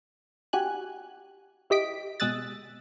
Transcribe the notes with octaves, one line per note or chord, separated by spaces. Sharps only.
F#4 G4 G#5 F#6
E4 G4 D#5 B6 D7
B2 G#3 D#6 E6 F#6 A6